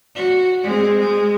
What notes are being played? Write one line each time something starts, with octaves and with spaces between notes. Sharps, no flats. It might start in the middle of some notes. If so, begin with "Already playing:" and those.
F#4
G#3 C4
G#3